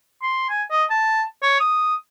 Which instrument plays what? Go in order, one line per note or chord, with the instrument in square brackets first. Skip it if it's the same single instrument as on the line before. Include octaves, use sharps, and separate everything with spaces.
[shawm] C6
G#5
D#5
A5
C#5
D#6